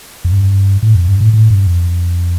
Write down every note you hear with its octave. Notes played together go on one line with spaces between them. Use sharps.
F2
G2
A2
F2
G2
A2
A2
G2
F2